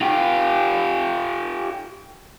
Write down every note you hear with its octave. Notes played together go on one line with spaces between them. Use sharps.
F4 G4